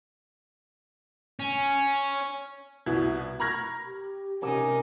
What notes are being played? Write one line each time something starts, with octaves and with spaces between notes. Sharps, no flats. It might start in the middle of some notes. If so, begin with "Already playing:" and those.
C#4
C2 B2 E4 G#6
A#5 B5 C#6 F6 G#6 A#6
G4
C3 C#4 D#4 A#4 D6 E6